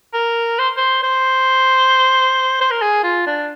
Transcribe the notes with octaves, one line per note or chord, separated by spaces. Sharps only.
A#4
C5
C5
C5
C5
A#4
G#4
F4
D4